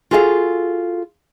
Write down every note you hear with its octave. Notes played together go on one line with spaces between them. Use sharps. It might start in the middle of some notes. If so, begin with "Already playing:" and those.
F4 F#4 G#4 A4 E5 F5